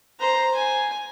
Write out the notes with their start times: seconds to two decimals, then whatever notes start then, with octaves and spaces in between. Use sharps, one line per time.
0.19 C5 A#5
0.55 G#5